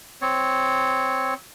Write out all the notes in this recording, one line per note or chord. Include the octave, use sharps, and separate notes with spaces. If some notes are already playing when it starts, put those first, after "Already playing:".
C4 C#5